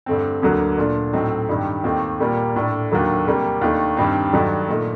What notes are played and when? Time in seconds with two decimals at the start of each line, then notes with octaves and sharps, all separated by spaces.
0.06 G2 D3 A3 C4
0.42 D2 D3 F#3 A#3
0.78 A#2 A3 D4
1.13 A2 F#3 A3 C4 D#4
1.49 G2 D#3 G3
1.84 D#2 D#3 A3 C4
2.20 A#2 G3 A#3
2.56 A2 A3 D4
2.91 D#2 D3 F#3 A#3 D4
3.27 C3 G3 A#3
3.61 D#2 D#3 A3 D4
3.97 G2 D#3 G3 C4
4.33 G2 D#3 F#3 A3 D4
4.69 A#2 A3 D#4